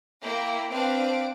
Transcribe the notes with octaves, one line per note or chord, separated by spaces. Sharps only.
A#3 E4 G5
C4 D4 B4 C5 F5 D7